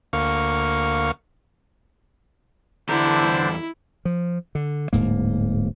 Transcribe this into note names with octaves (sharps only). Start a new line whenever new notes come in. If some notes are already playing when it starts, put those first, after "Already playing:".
D2 A#3 F5 C#6
E2 D3 D4 E4 A4 C5 A#5
F3
D3
D1 G#2 A#3